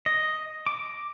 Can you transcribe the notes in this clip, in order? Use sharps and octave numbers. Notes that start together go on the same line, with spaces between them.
D#5
D6